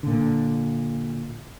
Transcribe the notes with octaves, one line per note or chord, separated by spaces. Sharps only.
A#2 D3